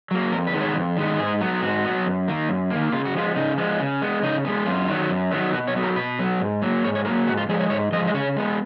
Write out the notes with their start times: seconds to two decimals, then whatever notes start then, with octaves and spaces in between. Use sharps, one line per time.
0.11 F#3 A#3
0.32 F2 A#4
0.47 B4
0.53 D#3 G#3 B3
0.61 C#5
0.75 F2
0.97 D#3 G#3 B3
1.19 G#2 G#4
1.41 F#3 B3
1.62 G#2 F#4
1.84 F#3 B3
2.06 F#2
2.28 D#3 A#3
2.49 F#2
2.70 D#3 A#3
2.92 C#3 F4
3.05 F#4
3.14 F3 G#3 B3 F4
3.36 C#3 D#4
3.58 F3 G#3 B3
3.80 C#3
4.02 G#3 B3
4.23 C#3 D#4
4.45 G#3 B3
4.66 F#2 F4
4.88 D#3 F#3 B3
5.10 F#2
5.31 D#3 F#3 B3
5.53 B2 F#4
5.68 C#5
5.75 F#3 B3
5.83 A#4
5.96 B2 B4
6.19 F#3 B3
6.40 G#2
6.62 F#3 A#3
6.84 G#2 C#5
6.95 C#5
7.05 F#3 A#3 A#4
7.27 G#2 F#4
7.37 F4
7.49 F3 G#3 G#4
7.59 C#5
7.70 G#2 C#5
7.92 F3 D#5
7.97 G#3
8.07 D#5
8.14 C#3 C#5
8.36 G#3 B3